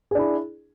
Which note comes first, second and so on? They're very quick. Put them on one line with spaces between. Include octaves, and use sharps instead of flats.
G#4 D4 E4